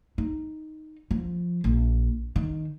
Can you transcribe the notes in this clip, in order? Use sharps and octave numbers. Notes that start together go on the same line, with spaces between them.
D#4
F3
A#1
D#3